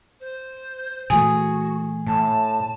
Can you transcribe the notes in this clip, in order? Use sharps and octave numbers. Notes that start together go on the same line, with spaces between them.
C5
A#2 E3 A3 F#4 G#4
A2 A5